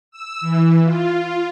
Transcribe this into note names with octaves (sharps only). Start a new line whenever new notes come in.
E6
E3
F4